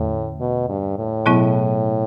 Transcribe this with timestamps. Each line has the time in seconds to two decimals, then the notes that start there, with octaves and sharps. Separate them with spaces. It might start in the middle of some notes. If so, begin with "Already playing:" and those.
Already playing: E2 A2 D3 A3
0.40 B2
0.69 G2
0.98 A2
1.26 B2 F#3 B3 E4